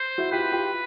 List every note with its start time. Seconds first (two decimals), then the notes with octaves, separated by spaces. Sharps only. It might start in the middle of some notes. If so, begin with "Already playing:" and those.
Already playing: C5
0.18 E4 F#4
0.32 F4 G4 B4
0.52 F4 G4